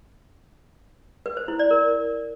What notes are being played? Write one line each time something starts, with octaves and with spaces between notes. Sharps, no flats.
B4
C5
E4
D5
A#4